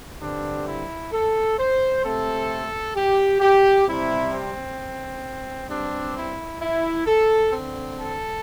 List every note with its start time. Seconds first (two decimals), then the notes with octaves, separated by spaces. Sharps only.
0.21 G2 D3 G3 C4 D4
0.67 E4
1.12 A4
1.59 C5
2.04 C3 A3 C4 A4
2.96 G4
3.40 G4
3.87 C3 G3 C4 E4
4.33 C4
5.69 G2 G3 C4 D4
6.16 E4
6.61 E4
7.06 A4
7.52 D3 C4
7.98 A4